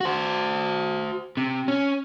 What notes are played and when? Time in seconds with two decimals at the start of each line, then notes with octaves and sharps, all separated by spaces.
0.01 F#4 C5
1.37 C3
1.68 C#4